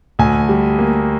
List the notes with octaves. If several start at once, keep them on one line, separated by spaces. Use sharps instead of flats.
D2 G#5
G3
A#3